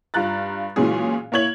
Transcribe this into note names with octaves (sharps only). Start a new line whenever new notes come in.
G2 F4 A#5 F#6 A6
A#2 E3 F#3 G#3 C#4 G#4
A#3 E4 C#5 G#6 F#7